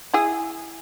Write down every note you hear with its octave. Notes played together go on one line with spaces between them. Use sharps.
E4 G#4